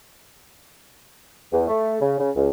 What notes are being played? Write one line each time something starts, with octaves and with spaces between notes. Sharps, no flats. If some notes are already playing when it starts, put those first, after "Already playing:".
E2
A3
C#3
C#3
C#2